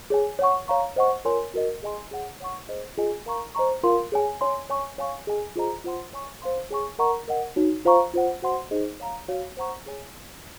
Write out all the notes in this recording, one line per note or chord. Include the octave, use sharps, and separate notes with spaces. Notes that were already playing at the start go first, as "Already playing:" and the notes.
G#4 C#5 G#5
C#5 F#5 C#6
C#5 F5 A#5 C#6
C5 D#5 F#5 C#6
F4 A#4 C#5 G#5 C6
F#4 A#4 D#5
G#4 D#5 G#5 C6
G#4 C#5 F#5
C#5 F#5 C#6
G#4 C5 D#5
F4 G#4 D#5 G#5
A#4 F5 A#5 C#6
C5 D#5 A#5 C#6
F4 A#4 F5 C6
G#4 C#5 G#5
C#5 G#5 C6
C#5 G#5 C#6
C#5 F5 G#5 C#6
G#4 D#5 G#5
F4 G#4 C5 D#5 A#5
F4 C5 F#5 C6
C#5 G#5 C#6
C5 F5 C6
G#4 C#5 G#5 C#6
A#4 D#5 F#5 A#5 C#6
A#4 D#5 F#5
D#4 F#4 C#5
F4 C5 F5 A#5 C#6
F4 C5 F#5
F#4 C5 F#5 C6
D#4 G#4 C5 D#5
C#5 F5 A#5
F#4 C#5 F5
C5 F#5 A#5 C#6
G#4 C#5 G#5